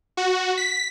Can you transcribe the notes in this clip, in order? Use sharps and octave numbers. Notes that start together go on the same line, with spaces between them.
F#4
B6